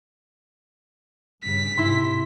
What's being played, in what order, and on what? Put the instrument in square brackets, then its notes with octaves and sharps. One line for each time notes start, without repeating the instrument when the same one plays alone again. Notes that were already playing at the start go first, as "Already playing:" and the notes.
[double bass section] G2 C#3 [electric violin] B6
[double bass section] G#2 C3 [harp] E4 C6